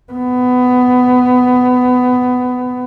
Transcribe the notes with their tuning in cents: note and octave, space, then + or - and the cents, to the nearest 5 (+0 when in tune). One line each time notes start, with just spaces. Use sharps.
B3 +20